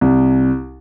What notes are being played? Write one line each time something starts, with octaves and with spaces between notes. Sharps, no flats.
C2